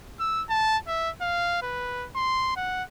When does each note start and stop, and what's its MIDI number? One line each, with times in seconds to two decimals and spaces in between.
0.20 0.43 88
0.50 0.78 81
0.87 1.10 76
1.22 1.60 77
1.62 2.07 71
2.16 2.52 84
2.57 2.83 78